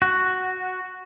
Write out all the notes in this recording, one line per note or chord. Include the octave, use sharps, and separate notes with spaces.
F#4